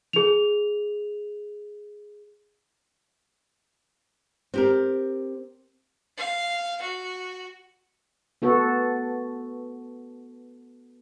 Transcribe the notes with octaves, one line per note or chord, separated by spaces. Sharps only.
G#4 F7
C4 G4 A#4
F5
F#4
B3 F#4 A4